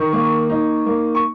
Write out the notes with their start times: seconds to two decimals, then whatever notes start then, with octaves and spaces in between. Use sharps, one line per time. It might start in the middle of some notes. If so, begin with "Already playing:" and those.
Already playing: D#3 C#6
0.13 A#3
0.50 D#4
0.86 A#3
1.15 C#6